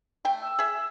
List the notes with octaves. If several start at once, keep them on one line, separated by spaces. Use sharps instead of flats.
A3 G5
E6
G#4 E5